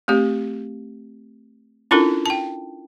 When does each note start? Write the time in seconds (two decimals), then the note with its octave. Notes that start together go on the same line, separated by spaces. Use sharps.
0.08 A3 C4 G4
1.91 C#4 D4 E4 F4 A4 A#4
2.26 G5 A5